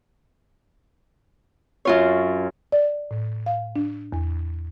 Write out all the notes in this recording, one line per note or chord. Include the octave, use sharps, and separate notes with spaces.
F#2 F4 C#5
D5
A2
F5
D4
E2